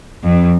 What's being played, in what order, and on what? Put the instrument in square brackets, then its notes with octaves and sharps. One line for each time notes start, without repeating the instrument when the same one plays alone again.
[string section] F2